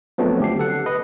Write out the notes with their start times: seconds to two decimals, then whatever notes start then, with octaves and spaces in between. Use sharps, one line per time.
0.18 F3 F#3 A3 B3 C4 D4
0.40 D2 G4 C7
0.59 A4 F#5
0.86 B4 D#5